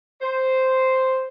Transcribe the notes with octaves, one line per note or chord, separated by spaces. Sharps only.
C5